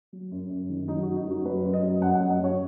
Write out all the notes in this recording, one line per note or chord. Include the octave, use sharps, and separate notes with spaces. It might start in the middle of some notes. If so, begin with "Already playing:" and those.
F#3
F#2
F#2
D#3
F#3 D#4
F#2 F#4
D#4
F#2 F#4
F#3 B4
F#2
D#5
F#3
F#2 F#5
F#5
F#3
D#5
F#2 C#5